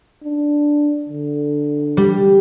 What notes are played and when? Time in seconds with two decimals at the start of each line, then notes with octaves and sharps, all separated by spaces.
0.24 D4
1.09 D3
1.97 G3